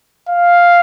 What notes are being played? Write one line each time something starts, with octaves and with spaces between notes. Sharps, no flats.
F5